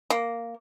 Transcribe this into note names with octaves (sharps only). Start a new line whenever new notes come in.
A#3